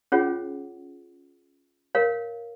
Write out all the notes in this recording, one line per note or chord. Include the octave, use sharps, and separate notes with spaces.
C#4 F4 G#4 C#5 F#5
A#4 C#5 F5